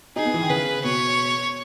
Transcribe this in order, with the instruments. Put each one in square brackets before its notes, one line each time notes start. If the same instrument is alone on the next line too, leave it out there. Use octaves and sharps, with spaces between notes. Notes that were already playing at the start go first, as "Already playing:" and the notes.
[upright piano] D#4 [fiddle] G#4
[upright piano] B3
E3
D#3
[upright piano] C#3 [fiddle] B4
[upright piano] B2 [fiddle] C#5